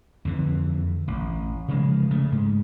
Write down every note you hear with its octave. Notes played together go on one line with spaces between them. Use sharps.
F2 D3 E3
A1
C#3 F3 G#3
C#3 A3
G#2